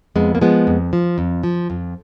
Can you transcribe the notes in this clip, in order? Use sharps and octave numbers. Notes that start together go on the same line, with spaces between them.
F2 G#3 B3
A#3
F3 G#3 B3
F2
F3
F2
F3
F2